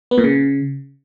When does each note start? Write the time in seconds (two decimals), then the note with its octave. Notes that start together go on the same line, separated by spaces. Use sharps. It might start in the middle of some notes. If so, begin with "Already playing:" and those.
0.11 B3
0.18 A#2
0.24 C#3